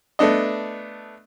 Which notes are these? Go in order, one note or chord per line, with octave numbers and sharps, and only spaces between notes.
A3 B3 D4 D#5